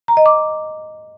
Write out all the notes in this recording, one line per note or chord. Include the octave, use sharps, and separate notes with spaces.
A#5
D#5
D6